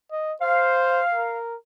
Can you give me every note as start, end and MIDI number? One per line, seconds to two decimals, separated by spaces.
0.12 0.33 75
0.42 1.01 72
0.42 1.37 77
1.14 1.55 70